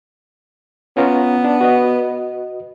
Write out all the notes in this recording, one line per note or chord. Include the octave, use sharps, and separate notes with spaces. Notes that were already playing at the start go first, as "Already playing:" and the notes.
B3 C#4 F4 A#5
D4
F#4 B4 D#5